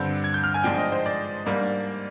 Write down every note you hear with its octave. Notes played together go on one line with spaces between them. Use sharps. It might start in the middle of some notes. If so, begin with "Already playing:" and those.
Already playing: G2 D3 G3 C4 G6
G#6
G6
F6
G#5
G#2 F3 G#3 D4 G5
D#5
C5
D5
G#2 G3 A#3 D4